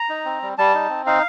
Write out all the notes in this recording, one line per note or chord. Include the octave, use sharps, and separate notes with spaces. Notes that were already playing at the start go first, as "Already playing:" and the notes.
Already playing: A#5
D#4
C4
G3
G3 A5
D#4
C4
D#4 F5